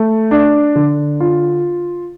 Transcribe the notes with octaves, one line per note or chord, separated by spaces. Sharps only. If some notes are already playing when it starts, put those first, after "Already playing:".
Already playing: A3
D4
D3
F4